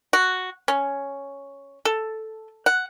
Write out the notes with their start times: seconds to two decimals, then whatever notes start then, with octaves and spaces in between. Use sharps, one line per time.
0.13 F#4
0.68 C#4
1.85 A4
2.66 F#5